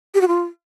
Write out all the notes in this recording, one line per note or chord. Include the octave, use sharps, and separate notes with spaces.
G4
F#4
F4